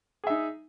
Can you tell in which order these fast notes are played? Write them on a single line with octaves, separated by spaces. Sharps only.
G#4 E5 D#4